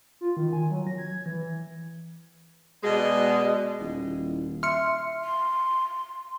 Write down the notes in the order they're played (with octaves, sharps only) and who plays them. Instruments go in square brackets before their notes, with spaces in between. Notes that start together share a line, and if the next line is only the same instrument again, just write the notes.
[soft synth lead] F4
D#3
G#5
F#3
A#6
G#6
E3
[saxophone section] B2 G#3 [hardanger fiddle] D5 D#5
[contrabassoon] D#1 [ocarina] E4
[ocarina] E5 [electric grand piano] C6 [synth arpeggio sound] F6 C#7
[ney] C6